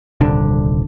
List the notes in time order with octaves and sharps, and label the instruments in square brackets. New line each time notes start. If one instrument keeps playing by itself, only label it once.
[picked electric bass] D#1 C2 D3 D4